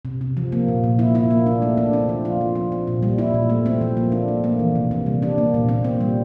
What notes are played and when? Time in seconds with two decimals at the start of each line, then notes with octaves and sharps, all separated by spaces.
0.05 C3
0.21 C3
0.37 F3
0.52 A#3
0.68 A#2
0.84 A#2
0.99 E4
1.15 E4
1.31 A#3
1.46 D4
1.62 A3
1.77 D4
1.93 C4
2.09 F3
2.25 F4
2.41 F3
2.56 C4
2.72 C4
2.87 A#2
3.03 G3
3.18 E4
3.34 A#2
3.50 A3
3.66 C4
3.81 F3
3.97 A#3
4.12 D4
4.28 A3
4.44 A#3
4.59 E3
4.76 C3
4.91 C3
5.06 G3
5.22 D4
5.38 A#3
5.54 A#2
5.69 C4
5.84 C4
6.01 G3